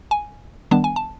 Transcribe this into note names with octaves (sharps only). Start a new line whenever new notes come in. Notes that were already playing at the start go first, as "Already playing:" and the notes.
G#5
D#3 G3 B3 D4 A5
G#5
A5